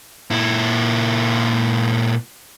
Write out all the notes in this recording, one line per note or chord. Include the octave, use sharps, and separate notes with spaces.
A#2 E4